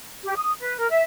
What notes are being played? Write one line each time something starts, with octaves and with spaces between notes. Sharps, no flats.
G4
D#6
B4
A#4
E5